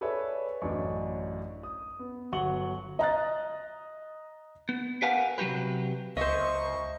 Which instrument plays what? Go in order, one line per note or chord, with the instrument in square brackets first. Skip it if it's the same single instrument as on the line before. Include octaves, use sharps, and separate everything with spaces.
[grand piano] G#4 A4 B4 C#5 D5 E5
A1 F#2 D4 D#5 C#6
D#6
B3
G1 F#3 F#5 C#6 F#7 G7
[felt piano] D#5 A#5 F#6 A6
[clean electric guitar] B3
G4 A#4 B4 F5 F#5 G#5
C3 F#3 A#3 F#4 G4 B4
[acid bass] C#2 [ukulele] C5 E5 [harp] D#5 [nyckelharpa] C#6